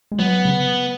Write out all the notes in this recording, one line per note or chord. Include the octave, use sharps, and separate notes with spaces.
G#3
F#3 B3
C#3